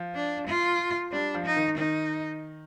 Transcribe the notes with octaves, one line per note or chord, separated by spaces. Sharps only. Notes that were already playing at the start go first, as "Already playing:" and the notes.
Already playing: F3
D4
F4
G3 D4
F3
D#4
D#3
D#3 D#4